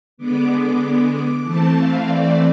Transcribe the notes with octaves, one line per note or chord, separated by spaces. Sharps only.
D3 G#3 B3 D6
E3 A3 C4 A5
F5
D5